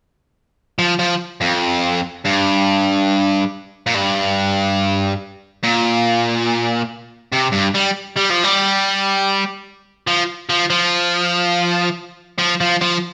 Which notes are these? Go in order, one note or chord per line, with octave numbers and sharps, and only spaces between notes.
F3
F3
F2
G2
A#2
G2
A#2
C3
G2
G3
G3
F3
G3
F3
F3
F3
F3
F3
F3